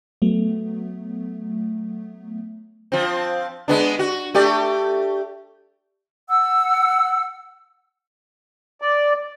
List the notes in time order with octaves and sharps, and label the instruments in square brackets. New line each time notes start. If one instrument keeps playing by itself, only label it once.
[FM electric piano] F#3 A3 B3
[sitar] F3 C4
G#3 B3 D4
F#4
A3 G4 D5
[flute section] F#5 E6
[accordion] D5